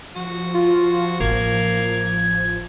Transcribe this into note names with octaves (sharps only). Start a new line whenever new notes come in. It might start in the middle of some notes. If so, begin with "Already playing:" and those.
F3 F#4
F4
A1 A#3 G#6